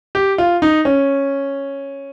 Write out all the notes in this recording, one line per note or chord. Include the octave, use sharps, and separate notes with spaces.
G4
F4
D#4
C#4